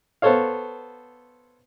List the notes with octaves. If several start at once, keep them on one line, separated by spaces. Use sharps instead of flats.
B3 A4 C5 C#5 F5